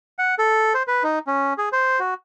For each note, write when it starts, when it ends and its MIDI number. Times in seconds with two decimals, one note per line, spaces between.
0.19 0.35 78
0.39 0.73 69
0.74 0.83 72
0.88 1.03 71
1.04 1.19 63
1.27 1.53 61
1.58 1.69 68
1.73 2.00 72
2.00 2.14 66